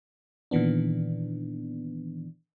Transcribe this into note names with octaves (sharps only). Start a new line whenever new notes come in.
A#2 D#3 E3 B3 D4